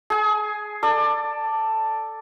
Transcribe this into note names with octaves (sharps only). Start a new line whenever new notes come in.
G#4 G#5
A4 D5